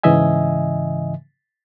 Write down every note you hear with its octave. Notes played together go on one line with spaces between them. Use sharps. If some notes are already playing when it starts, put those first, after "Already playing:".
G#2 C#3 E3 D#5 E5 G#5